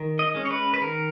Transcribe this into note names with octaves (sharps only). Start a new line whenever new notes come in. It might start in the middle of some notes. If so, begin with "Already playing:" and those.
Already playing: D#3
D#5
G#3 C#4
C#5
B4
B4
D#3 A#4